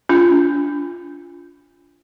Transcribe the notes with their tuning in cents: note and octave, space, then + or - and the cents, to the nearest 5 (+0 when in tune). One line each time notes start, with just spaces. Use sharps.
D4 -30 F4 -10